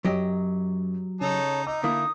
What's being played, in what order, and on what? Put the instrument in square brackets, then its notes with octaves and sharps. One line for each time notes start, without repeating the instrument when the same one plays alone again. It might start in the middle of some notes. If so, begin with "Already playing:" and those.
[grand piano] F#2 [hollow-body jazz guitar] F#3 G4 D#5
[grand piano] C#3 [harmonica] D#4 A4 [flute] C#5
[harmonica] D#4 [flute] D#5 [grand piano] D6 E6
[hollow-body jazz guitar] D3 A#3 E4 [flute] D#6